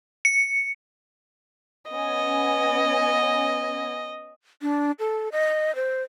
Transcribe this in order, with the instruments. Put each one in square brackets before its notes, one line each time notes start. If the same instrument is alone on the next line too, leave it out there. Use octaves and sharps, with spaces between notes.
[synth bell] C#7
[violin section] B3 C#4 G#5 [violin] D#5
[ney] D4
A4
D#5
C5